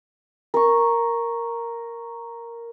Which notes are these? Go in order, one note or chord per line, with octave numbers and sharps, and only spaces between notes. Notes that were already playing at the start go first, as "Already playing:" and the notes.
A#4 C#6